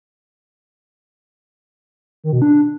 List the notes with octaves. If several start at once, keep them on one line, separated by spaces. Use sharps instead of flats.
D#3
B2
D4